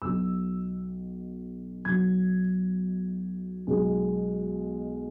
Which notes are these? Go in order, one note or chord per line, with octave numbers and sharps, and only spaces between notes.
B1 B2 F#3 E6
B1 B2 F#3 G#6
B1 B2 G#3